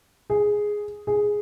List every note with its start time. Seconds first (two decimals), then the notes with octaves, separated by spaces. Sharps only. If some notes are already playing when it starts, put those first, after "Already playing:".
0.30 G#4
1.07 G#4